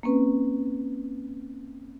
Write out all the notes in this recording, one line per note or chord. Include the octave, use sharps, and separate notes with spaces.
A#3 C4 C#4 B4